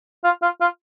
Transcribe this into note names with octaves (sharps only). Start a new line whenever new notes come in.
F4
F4
F4